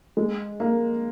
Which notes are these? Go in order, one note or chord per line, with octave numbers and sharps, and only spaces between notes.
G#3
A#3